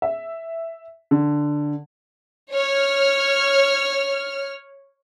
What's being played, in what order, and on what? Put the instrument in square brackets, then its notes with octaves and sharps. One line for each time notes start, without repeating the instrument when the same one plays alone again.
[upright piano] E5
D3
[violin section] C#5 F6